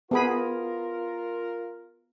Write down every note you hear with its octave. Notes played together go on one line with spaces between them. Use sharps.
B3 F4 G#4 A#4 B5